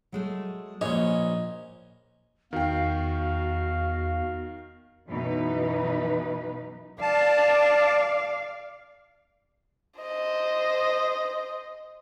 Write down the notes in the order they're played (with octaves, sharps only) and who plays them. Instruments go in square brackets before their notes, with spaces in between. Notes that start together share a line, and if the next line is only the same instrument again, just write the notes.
[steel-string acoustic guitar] F#3 G#3 A3
[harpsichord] A#1 C#4 [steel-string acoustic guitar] A#2 [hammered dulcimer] D#5
[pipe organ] E2 [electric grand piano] D#3 G5 [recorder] F#4 [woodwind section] F5
[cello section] F#2 B2 E3 D#4 B4
[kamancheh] D5 [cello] F5 [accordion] A5
[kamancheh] C5 D#5